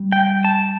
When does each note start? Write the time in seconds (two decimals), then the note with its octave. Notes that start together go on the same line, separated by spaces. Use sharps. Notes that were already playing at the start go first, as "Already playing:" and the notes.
Already playing: G3
0.12 G5
0.45 A5